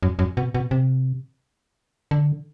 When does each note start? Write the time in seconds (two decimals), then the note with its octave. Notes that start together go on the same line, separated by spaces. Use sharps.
0.03 F#2
0.19 F#2
0.37 B2
0.54 B2
0.71 C3
2.11 D3